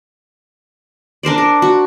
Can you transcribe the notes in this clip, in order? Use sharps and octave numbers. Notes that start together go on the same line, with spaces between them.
D4 A#4 C5 D5
A#4
F#4